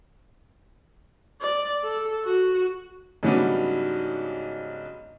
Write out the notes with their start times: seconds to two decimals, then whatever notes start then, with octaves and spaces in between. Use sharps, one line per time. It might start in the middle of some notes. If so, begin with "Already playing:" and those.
1.42 D5
1.84 A4
2.25 F#4
3.23 G#2 C#3 F#3 G3 B3 D4